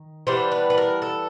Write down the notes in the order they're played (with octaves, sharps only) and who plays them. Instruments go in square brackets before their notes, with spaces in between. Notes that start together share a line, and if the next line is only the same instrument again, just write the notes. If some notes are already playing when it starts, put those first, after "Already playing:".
Already playing: [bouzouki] D#3
E3 G3 B3 D4 C5
B4
B4
A#4
A4